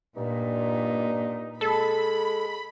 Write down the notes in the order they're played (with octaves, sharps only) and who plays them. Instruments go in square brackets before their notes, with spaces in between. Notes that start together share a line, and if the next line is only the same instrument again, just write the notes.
[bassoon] G2 [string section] A#2 [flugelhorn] D#4
[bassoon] G#3 [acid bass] A4 [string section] B5